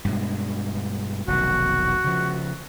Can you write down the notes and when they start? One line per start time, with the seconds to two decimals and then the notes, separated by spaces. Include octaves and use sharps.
0.05 G2 B2 G#3
1.28 F1 B1 D#3 F#4
2.04 C#3 F3